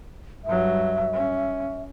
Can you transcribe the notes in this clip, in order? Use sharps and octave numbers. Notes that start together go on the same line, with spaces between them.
G2 F#3 E5
C#4